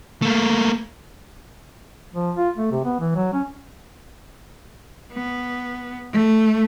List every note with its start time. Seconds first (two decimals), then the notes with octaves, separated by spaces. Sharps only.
0.22 A3 A#3
2.14 F3
2.36 F4
2.57 A3
2.72 C3
2.85 B3
3.00 E3
3.15 F#3
3.34 C#4
5.12 B3
6.12 A3